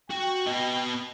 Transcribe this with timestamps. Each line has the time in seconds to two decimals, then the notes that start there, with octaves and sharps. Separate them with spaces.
0.10 F#4 G5
0.47 B3 D#5